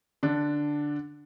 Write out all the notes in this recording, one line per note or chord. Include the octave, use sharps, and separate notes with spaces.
D3 D4